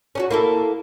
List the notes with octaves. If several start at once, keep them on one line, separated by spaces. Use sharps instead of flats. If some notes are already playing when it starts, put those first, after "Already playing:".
C#4 D4 F#4
A#3 E4 A4